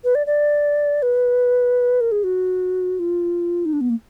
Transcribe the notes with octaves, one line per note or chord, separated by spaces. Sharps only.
B4
D5
D5
B4
A#4
G#4
F#4
F4
D#4
D4
B3
A#3